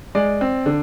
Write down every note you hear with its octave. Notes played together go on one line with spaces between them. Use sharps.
G#3 D5
C4
D3